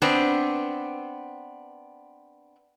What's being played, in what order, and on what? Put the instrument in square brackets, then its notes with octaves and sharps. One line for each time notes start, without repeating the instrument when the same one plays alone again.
[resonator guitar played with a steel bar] B3 C4 D4